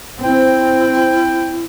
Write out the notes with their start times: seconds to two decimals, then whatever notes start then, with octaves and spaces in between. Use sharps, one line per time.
0.24 C4 E4 G5